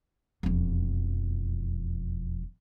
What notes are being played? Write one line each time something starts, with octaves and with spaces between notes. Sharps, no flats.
E1 F2